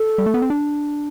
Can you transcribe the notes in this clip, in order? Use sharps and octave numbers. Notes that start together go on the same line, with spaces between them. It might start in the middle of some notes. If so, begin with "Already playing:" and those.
Already playing: A4
G3
A3
B3
C4
D4